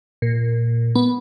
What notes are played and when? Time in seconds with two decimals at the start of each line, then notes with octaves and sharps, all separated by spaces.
0.22 A#2
0.95 B3